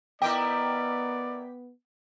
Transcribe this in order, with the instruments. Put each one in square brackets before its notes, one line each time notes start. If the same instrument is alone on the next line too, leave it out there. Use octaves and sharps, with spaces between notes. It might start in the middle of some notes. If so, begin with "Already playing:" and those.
[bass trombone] B3 [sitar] E4 A#4 D#5 [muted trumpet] D5 [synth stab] G5 D6 B6